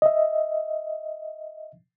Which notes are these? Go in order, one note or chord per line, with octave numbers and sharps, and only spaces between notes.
D#5 E5